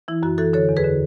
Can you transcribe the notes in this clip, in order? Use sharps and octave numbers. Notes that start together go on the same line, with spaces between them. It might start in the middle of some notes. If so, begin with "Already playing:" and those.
E3 E4
F#2 F#4
E3 F#4 A4
D3 A4 C#5
E2
G#4 B4
D3